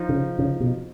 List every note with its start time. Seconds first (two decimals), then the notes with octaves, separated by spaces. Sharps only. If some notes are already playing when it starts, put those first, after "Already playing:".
Already playing: F3 D#4
0.09 C#3
0.39 C#3
0.60 B2